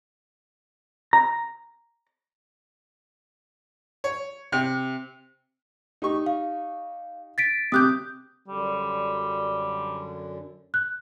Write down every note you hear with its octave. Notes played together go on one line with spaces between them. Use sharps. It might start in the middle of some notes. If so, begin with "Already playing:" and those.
A#5
C#5
C3
D#4 G4 C#6
F5
A6 B6 D7
C3 G4 D6 D#6 F#6 G6
F#2 D3 G3
F#6